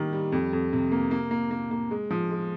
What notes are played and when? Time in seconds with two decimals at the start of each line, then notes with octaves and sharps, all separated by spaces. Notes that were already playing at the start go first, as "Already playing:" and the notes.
Already playing: D#3 G3 A#3
0.13 G3
0.32 F2
0.53 F2
0.73 C3
0.92 A#3
1.11 A#3
1.31 A#3
1.51 A#3
1.71 A#3
1.91 G#3
2.11 F3
2.31 G#3